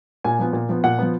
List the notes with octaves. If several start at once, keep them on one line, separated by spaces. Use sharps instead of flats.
A#2 G#5
F3 B3
A#2
F3 B3
A#2 F#5
F3 B3